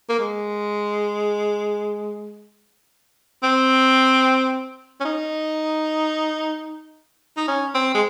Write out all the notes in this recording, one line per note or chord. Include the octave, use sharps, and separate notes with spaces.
A#3
G#3
C4
C#4
D#4
D#4
C#4
C4
G#3